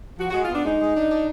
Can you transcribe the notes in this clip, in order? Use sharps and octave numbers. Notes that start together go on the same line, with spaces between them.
F3 F#4
F#4
G#3
F4
B3 D4
G#3 D#4
G#3
D4
D4